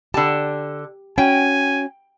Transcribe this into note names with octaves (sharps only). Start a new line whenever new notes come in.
D3 G4 A5
C#4 F#4 G5 G#5